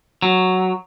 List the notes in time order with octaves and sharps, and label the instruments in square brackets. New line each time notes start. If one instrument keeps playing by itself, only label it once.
[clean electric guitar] F#3